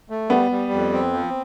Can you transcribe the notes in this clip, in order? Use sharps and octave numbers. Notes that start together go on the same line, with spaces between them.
A3
G3 B3
G3
F2
C4
F3